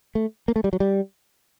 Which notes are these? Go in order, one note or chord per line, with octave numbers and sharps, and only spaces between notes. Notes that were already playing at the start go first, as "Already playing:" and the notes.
A3
A#3
A3
G3
F#3
G3